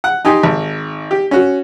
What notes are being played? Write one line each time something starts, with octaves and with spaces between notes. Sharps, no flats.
F#5
D#4 G4 G#5 C6
G#1
G4
C#4 F#4